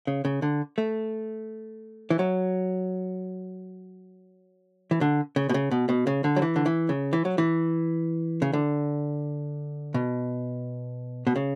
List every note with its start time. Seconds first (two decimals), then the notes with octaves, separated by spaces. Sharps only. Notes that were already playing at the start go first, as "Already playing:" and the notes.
0.07 C#3
0.25 C#3
0.42 D3
0.78 A3
2.10 E3
2.19 F#3
4.91 E3
5.01 D3
5.36 C#3
5.49 B2
5.54 C#3
5.71 B2
5.89 B2
6.07 C#3
6.24 D3
6.36 F#3
6.42 E3
6.56 D3
6.66 E3
6.89 C#3
7.13 E3
7.25 F#3
7.38 E3
8.42 C#3
8.53 D3
9.94 B2
11.27 B2
11.36 C#3